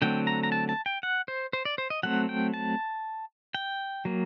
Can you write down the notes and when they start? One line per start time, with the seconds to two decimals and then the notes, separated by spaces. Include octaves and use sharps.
0.02 D3 F#3 A3 C4 G5
0.27 A#5
0.43 A#5
0.52 A5
0.69 A5
0.86 G5
1.03 F#5
1.28 C5
1.53 C5
1.65 D5
1.78 C5
1.90 D#5
2.03 F#3 A3 C4 F#5
2.29 G5
2.54 A5
3.55 G5
4.05 F#3 A#3